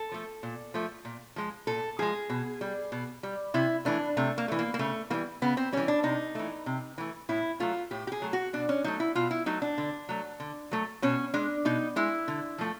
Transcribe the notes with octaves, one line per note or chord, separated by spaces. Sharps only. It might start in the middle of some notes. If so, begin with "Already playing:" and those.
Already playing: A4
F3 A3
A#2
F3 A3
A#2
F3 G#3
A#2 A4
F3 G#3 G#4
B2
G3
B2
G3
C3 E4
E3 A3 D4
C3 A3
A#3
E3 A3
A#3
A#3
C#3 A3
E3 G3 A#3
C#3 B3
C4
E3 G3 C#4
D4
C3 D#4
E3 A3
C3
E3 A3
A2 E4
F#3 A3 F4
A2 G4
G4
G#4
F#3 A3
F#4
B2 D4
C#4
F#3 A3 D#4
E4
B2 F4
E4
F#3 A3 D#4
D4
D3
F#3 A3
D3
F#3 A3
B2 C#4
G#3 D4
B2 D#4
G#3 E4
D3
F3 A3